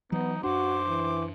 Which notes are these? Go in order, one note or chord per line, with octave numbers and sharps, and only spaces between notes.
E3 F#3 B3 D#4
F#2 D4 F#4 C5 D6
E3